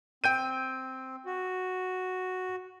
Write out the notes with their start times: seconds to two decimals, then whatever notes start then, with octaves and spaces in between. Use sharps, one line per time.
0.24 C4 G5 G6 D#7
1.26 F#4